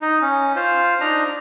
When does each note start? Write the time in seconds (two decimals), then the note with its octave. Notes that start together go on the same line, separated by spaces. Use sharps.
0.02 D#4
0.21 C#4
0.56 F4 C5
1.00 D4 D#4 A#5